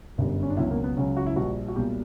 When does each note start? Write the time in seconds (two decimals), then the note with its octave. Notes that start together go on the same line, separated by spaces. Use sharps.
0.18 G1 F#2 D3 G3
0.42 C#4
0.50 D4
0.57 C#2 B2 F#3 E4
0.71 A#3
0.84 B3
0.97 C#2 C#3 F#3 C#4
1.17 F#4
1.26 E4
1.36 A#1 A#2 G3 F#4
1.68 F#4
1.76 B1 A#2 G3 G4